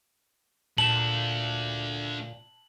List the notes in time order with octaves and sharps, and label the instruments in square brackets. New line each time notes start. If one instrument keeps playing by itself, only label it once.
[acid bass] A#2 [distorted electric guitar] A3 D4 [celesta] A5 E7 [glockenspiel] F#7